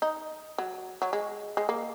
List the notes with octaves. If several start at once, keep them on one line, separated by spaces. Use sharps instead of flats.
D#4
F#3
F#3
G#3
G#3
A#3